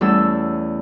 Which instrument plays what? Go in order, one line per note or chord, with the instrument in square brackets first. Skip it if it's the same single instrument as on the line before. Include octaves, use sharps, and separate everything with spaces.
[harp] E2 G3 A3 C#4 A4 E6